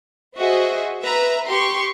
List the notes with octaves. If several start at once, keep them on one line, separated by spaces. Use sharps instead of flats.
F#4 G#4 C5 D#5 E5
B4 E5 A#5
G4 C6 C#6